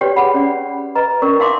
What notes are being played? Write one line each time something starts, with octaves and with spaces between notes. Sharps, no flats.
F#4 G4 B4 C#5 D5 G5
G#4 F#5 B5
C#4 D5
B4 D#5 A#5
C#4 A#4 D5 C#6 E6
D#4 E5 F5 C6 D6